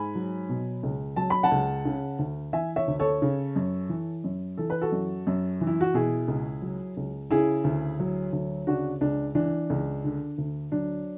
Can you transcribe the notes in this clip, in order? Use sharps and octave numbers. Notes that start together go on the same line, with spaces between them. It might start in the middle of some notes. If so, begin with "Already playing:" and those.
Already playing: G#2 G#5 B5
F#3
B2
C#2
F#3 A5
B5
F#5 A5
C#2
C#3
D2
E3 E5 G#5
C#5 E5
D2
A4 C#5
C#3
F#2
E3
F#2
E3 A4
B4
F#4 A4
F#2
F#2
E3
E4
F#4
B2 E4 G#4
C#2
F#3
C#2
C#3 E4 G#4
D2
F#3
D2
C#3 D4 F#4
C#2 D4
E3 D4
C#2
D3
D2
F#3 D4